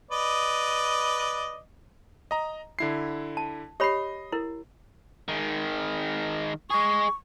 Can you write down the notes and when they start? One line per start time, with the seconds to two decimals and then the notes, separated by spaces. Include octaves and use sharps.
0.11 B4 D5 D#5
2.31 D#5 A#5
2.79 D3 E4 C7
3.37 A5
3.80 G4 C#5 D#5 B5 C7
4.32 E4 A#4
5.28 D#3 G#3
6.70 G#3 G#4 C#6